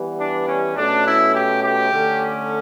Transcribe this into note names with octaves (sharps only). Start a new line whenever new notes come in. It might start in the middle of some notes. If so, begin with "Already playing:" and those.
Already playing: E3 G3 B3
D4
C#4
B2 A3 C#4 D4
E4
G4
G4
D3 A3 C#4